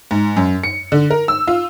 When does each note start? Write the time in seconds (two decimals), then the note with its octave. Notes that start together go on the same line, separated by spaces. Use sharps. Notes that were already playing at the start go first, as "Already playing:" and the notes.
0.11 G#2
0.37 F#2
0.64 C#7
0.92 D3
1.10 A#4
1.28 E6
1.47 F4